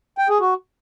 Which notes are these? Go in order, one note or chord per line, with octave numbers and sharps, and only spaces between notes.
G5
G#4
F#4